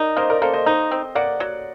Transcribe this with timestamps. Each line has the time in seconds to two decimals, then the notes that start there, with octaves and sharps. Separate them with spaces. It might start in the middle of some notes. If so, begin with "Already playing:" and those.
Already playing: D#4 A#4 D5
0.17 A#3 C5 D#5
0.30 A#4 D5
0.42 A#3 A4 C5
0.54 C5 D#5
0.66 D#4 C5 D#5
0.91 C4
1.15 A#3 D5 F#5
1.40 F#3